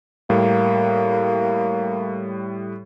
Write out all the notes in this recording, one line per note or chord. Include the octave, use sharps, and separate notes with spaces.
A2 G3 A#3